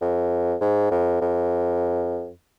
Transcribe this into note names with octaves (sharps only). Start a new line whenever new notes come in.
F2
G#2
F2
F2